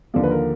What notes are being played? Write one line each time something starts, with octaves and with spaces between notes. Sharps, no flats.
D#2 D3 F3 A#3 D5
B4
A#4